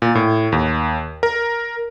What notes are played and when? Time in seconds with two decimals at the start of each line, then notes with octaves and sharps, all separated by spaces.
0.02 A#2
0.15 A2
0.52 D#2
1.23 A#4